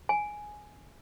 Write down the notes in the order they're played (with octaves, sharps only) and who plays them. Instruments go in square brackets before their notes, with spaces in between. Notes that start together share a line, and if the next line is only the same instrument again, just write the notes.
[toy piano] G#5